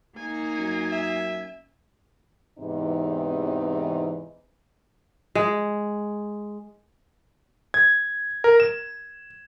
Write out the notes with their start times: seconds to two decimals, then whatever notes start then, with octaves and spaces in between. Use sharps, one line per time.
0.17 A#3 D#4 G#5
0.59 F#2
0.92 E5
2.58 E2 G#2 C3 E3 C4 D#4
5.35 G#3
7.74 G#6
8.44 A#4
8.60 E7